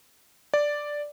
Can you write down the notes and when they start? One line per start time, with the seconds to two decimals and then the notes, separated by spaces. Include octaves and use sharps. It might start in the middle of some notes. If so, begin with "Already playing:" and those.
0.54 D5